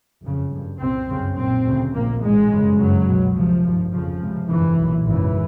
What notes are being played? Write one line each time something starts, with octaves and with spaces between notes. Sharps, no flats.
F#1 F2 C#3
G1 G2
C2 C3 C4
G1 F#2 C#3
B1 A#2 C4
D2 C#3
A#1 A#2 A#3
A1 G#2 G#3
G1 F#2 C#3
G1 F#2 C#3 F#3
C#2 B2
C#2 C3 F3
G#1 G2
F1 F2 C#3 F3
C#2 C3
G1 F2 C3 E3
B1 A#2
G#1 F#2 C#3 E3